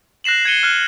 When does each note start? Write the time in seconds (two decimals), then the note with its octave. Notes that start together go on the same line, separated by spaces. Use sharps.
0.24 F#6 A#6 C7 E7 F#7
0.45 G#6 C7 C#7 D#7 G7
0.63 F6 F#6 G#6